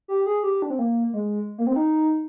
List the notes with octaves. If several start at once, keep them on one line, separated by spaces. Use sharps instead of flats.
G4
G#4
G4
D4
C4
A#3
G#3
A#3
C4
D#4